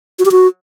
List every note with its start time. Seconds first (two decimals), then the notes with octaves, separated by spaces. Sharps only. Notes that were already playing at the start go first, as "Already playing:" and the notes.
0.19 F#4
0.25 G4
0.32 F#4